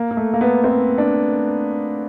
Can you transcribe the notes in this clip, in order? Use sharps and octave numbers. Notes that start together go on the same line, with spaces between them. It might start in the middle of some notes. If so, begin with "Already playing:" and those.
Already playing: A#3
A#3
A3
A#3
B3
C4
D4